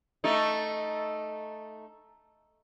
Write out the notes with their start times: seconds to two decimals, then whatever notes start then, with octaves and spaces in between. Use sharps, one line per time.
0.24 A3 D#4